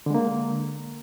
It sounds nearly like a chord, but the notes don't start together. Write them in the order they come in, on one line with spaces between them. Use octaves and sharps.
D3 G#3 A#3